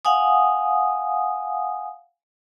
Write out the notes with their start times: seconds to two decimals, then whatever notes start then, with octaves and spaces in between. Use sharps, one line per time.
0.05 F5 F#5 G#5 D#6